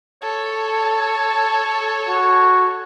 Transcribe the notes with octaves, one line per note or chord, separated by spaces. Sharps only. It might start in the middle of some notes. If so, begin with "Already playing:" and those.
A4 C#5
F#4